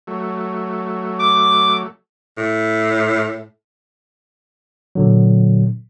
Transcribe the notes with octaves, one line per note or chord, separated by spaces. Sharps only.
F#3 A3
D6
A2
A#2 D3 F#3